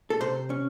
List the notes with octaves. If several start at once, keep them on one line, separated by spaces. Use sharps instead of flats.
A4
C3 C5
C#4